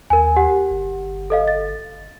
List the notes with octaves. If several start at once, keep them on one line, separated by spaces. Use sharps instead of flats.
D#2 A#4 G#5
G4 F#5
G1
A4 D#5 F5
A6